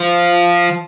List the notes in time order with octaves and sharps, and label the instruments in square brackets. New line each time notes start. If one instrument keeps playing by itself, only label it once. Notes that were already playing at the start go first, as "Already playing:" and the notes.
Already playing: [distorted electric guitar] F3